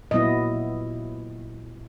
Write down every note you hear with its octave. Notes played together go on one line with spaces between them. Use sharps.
A#2 F#3 B3 E4 D#5